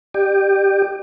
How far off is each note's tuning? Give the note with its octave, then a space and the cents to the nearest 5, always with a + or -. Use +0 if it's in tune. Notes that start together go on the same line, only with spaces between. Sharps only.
G4 +0 D5 +40